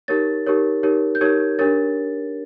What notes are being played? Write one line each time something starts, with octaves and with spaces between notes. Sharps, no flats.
D#4 G4 A#4 C#5 A6
D#4 G4 A#4 C#5
D#4 G4 A#4 C#5
G6
D#4 G4 A#4 C#5 G#6
D4 G4 A#4 C#5 A6